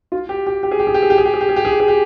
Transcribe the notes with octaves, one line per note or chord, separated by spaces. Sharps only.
F4
G4
G4
G4
G#4
G4
G#4
G4
G#4
G4
G#4
G4
G#4
G4
G#4
G4
G#4
G4
G#4
G4